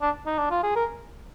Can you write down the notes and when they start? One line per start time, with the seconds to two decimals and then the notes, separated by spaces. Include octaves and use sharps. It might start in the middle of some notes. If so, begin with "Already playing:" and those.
0.01 D4
0.26 D#4
0.38 D4
0.51 F4
0.63 G#4
0.75 A#4